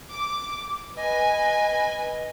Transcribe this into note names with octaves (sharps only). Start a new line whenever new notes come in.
D6
B4 D#5 G#5